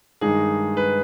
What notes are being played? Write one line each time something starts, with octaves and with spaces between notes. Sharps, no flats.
G2 D#3 G#3 D#4 G#4
B4